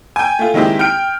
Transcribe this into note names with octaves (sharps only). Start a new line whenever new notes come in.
G5 G#5
A3 F4
D#3 G#3 C4 E4 G4
G5 F6 D7